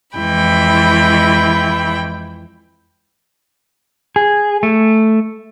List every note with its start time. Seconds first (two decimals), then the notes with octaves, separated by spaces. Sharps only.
0.17 F2 E3 G#3 E4 G5 B5
4.16 G#4
4.63 A3